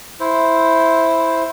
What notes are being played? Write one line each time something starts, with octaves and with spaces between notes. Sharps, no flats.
E4 C5